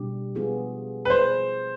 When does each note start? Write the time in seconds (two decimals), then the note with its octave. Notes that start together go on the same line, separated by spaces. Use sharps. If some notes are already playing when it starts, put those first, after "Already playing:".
Already playing: B2 G3 D4 G4
0.35 F3 G#3 B3 F4 G#4
1.05 B4
1.10 F3 G#3 B3 F4 G#4 C5